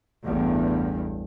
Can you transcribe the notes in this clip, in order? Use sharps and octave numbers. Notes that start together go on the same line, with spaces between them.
A1 E2 G2